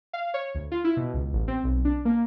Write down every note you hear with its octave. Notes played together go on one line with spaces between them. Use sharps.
F5
C#5
D2
F4
E4
B2
C#2
A1
C4
B1
D4
A#3